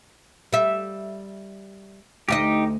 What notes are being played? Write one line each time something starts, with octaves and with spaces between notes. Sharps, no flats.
G3 E5
D2 D#4 F4 G4 D#5